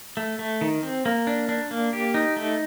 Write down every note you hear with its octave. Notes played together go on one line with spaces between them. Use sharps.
A3
A3
D#3
C4
A#3
D4
D4
A#3
G4
D#4
A3